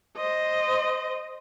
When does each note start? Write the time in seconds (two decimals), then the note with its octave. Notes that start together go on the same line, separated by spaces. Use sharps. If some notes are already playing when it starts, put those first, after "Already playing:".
0.17 C5 D#5